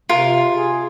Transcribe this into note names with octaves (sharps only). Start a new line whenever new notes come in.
C3 F4 A#4
G#4